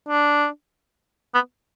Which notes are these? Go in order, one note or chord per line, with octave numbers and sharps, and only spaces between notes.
D4
B3